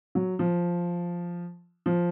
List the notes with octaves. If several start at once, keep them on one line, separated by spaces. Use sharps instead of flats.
F#3
F3
F3